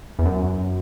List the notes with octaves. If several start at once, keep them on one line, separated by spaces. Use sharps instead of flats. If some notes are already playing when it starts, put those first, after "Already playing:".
E2
F#2